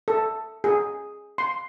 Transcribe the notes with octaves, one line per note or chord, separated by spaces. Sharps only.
A4
G#4
C6